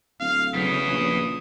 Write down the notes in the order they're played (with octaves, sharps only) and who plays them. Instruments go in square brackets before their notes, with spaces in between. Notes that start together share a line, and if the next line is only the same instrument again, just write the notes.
[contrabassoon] D1 [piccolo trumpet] F5
[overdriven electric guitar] E2 E4 [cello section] C#3 F#3 [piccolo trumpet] D#6
[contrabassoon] A#1